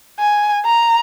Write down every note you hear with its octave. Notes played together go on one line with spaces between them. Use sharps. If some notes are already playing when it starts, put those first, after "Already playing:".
G#5
A#5